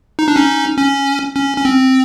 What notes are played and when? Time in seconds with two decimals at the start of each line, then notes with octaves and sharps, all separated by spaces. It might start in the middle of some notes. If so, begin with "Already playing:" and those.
0.19 D#4
0.28 D4
0.36 C#4 D#4
0.78 C#4
1.36 C#4
1.57 C#4
1.65 C4